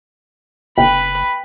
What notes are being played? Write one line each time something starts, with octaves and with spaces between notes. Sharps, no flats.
F#1 B4 G5 B5